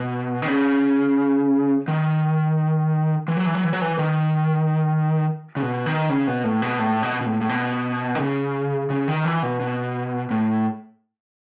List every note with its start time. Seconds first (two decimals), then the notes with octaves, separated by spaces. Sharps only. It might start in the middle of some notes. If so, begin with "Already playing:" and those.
Already playing: B2
0.42 D#3
0.48 C#3
1.88 D#3
3.28 E3
3.37 F#3
3.46 E3
3.55 F#3
3.64 E3
3.73 F#3
3.82 E3
3.98 D#3
5.56 C#3
5.62 B2
5.86 D#3
6.10 C#3
6.27 B2
6.44 A2
6.62 B2
6.79 A2
7.03 B2
7.21 B2
7.26 A2
7.41 A2
7.49 B2
8.15 D#3
8.20 C#3
8.90 C#3
9.08 D#3
9.25 E3
9.43 B2
9.60 B2
10.31 A2